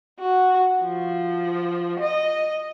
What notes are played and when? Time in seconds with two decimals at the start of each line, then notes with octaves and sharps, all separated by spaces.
0.19 F#4
0.82 F3
2.00 D#5